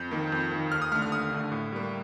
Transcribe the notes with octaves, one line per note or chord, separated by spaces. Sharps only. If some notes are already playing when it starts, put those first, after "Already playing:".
Already playing: F2 G6
D#3 A#3
F2
D#3 A#3
D#2 F6
D#6
D3 A3 F6
F6
D#2 D#6
D3 A3
A2
G3 A#3